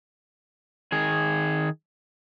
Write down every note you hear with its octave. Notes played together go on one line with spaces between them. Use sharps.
D#3 G#4